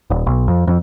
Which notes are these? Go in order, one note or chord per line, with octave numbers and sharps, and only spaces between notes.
D#1
B1
F2
F2